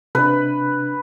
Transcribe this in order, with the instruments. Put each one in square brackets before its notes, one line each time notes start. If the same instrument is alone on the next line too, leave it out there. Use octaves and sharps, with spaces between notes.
[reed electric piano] C3 D4 [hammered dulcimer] B4